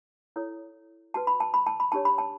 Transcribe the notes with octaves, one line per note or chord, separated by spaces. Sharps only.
E4 A4 C#5
F#4 B4 A5
B5
A5
B5
A5
B5
D4 G4 C#5 A5
B5
A5